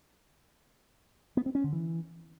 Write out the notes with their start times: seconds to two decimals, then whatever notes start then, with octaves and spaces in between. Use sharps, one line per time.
1.37 B3
1.46 C4
1.55 C#4
1.64 D3
1.73 E3